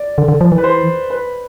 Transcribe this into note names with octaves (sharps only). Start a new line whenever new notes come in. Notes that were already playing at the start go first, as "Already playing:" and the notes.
Already playing: D5
D3
D3
F3
E3
B4
C5
B4